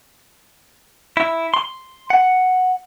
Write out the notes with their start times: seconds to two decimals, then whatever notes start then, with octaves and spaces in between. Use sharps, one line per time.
1.17 E4
1.54 C6
2.10 F#5